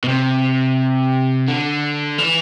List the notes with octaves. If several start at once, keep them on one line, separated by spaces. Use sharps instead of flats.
B2
C3
D3
E3